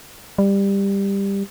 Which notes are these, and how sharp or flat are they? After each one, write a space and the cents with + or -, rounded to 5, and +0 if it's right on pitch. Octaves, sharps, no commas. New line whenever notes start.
G3 +15